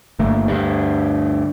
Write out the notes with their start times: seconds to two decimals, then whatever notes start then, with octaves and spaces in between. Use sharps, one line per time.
0.19 G1 D3 A3 A#3
0.48 D2 G2